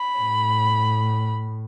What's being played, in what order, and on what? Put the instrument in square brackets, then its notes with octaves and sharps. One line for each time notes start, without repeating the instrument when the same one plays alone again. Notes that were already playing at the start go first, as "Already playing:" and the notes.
Already playing: [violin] B5
[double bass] A2